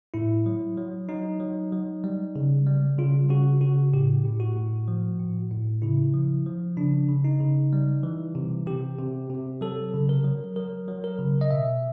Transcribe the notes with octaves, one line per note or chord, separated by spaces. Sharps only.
A2 E4
F#3
F#3
F#3 D#4
F#3
F#3
G3
C#3
G3
C#3 F4
C#3 F#4
C#3 F#4
A2 G4
A2
F#4
A2
F3
A2
A2
C#3 E4
F3
F3
C#3 D4
C#3
D#4
C#3
G3
E3
C3
C3 G4
C3
C3
F#3 A4
C#3
A#4
F#3
F#3 A#4
F#3
A#4
C#3
D#5
B2 E5